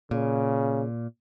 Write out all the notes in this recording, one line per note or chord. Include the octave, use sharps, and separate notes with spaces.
A#2 C#3